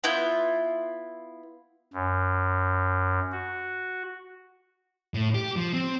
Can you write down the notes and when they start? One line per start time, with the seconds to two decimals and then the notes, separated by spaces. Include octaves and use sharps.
0.04 B3 E4 F4 G6
1.93 F#2
3.32 F#4
5.14 A2
5.35 G4
5.56 F3
5.74 C4